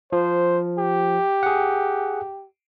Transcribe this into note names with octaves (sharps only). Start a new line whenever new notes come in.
F3 C5
G4
G#4 F#5